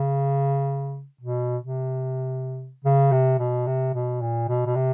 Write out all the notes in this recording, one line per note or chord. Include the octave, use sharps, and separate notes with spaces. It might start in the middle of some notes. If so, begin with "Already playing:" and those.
Already playing: C#3
B2
C3
C#3
C3
B2
C3
B2
A#2
B2
B2
C3